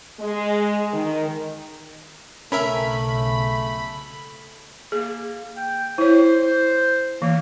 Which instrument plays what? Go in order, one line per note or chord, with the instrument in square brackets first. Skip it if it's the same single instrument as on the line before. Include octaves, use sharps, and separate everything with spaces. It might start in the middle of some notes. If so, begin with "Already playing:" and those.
[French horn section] G#3
D#3
[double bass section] B1 C#3 [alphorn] A3 [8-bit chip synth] C#4 A#4 E5 [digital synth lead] B5
[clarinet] A#3 [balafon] G#4
[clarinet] G5
[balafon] E4 C#5 [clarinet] C5
[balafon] E3 [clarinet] A#3